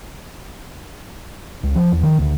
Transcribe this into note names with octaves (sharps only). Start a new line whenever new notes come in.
C#2
F3
E2
D#3
D2